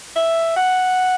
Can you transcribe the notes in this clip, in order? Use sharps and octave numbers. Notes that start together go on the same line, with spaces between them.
E5
F#5